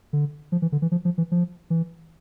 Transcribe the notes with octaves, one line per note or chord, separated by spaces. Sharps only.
D3
F3
E3
D3
E3
F3
F3
E3
F3
E3